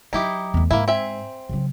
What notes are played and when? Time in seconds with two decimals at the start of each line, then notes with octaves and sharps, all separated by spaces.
0.13 F#3 D#4 E4 G4
0.54 E2 A3
0.71 G#2 A#3 E4
0.88 C4 E5 G#5
1.49 C#3 F#3